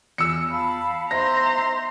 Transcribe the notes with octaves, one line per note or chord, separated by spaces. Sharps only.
E2 F4 G#4 E6 C#7
F5 A5 B5
B3 D#4 E4 C5 E5 A#5 C6 A#6